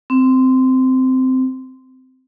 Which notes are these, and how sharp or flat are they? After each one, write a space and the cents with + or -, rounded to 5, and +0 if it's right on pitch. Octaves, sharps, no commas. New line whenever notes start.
C4 -15